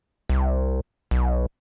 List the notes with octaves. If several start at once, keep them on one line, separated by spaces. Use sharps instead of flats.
C2
B1